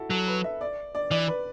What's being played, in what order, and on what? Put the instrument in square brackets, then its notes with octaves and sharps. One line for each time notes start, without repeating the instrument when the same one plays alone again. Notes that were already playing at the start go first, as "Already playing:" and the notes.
Already playing: [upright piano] E4 F#4 A4
[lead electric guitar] F#3 [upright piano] A4
[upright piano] B4
E5
D5
D5
[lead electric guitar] E3 [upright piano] D5
[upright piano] B4